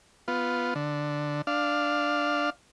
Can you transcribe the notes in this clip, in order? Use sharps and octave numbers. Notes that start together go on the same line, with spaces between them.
B3 F4
D3
D4 F5